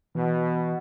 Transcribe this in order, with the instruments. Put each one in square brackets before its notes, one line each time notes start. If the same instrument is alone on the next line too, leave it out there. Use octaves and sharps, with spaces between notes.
[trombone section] B2 [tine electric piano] E3